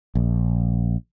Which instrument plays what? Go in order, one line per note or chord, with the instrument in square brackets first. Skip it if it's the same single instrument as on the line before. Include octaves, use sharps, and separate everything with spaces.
[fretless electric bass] A#1